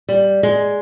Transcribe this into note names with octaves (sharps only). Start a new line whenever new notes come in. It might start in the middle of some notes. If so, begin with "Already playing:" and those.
G3
G#3